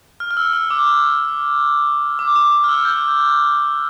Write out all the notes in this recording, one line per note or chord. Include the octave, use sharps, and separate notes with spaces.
F6
F6
E6
E6
D6
D6
D6
F6
E6
G6